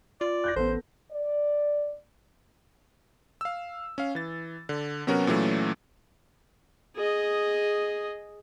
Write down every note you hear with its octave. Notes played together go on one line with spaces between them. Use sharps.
F4 D5
F#6 G6 A#6
A1 B3 A4 C5
D5
F5 E6
C#4 F5
E3 A6
D3
C3 F#3 B3 C#4 F#4 A#4
A#2 E3 F#3 A3 C#4
G#4 D#5